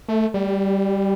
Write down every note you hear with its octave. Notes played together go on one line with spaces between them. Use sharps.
A3
G3